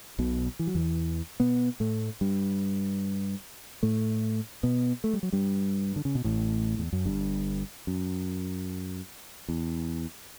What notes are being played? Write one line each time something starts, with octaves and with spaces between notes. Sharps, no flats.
B1 B2
E3
F#3
E2 E3
B2 B3
A2 A3
G2 G3
A2 A3
B2 B3
A3
G3
F#3
G2 G3
D3
C#3
B2
A1 A2
E2
F#2
G1 G2
F#2
E2